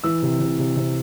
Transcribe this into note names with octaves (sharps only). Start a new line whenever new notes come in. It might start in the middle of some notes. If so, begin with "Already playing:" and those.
E3 E6
C3
C3
C3
C3